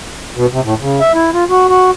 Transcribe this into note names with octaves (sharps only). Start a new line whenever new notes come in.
B2
C3
A2
C#3
E5
E4
F4
F#4
F#4